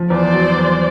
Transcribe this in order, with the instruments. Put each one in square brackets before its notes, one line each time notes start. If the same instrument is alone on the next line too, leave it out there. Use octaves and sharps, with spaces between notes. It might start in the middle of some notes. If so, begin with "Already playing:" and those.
Already playing: [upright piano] F3
[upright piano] E2 [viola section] C5 D5
[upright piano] F#3
E2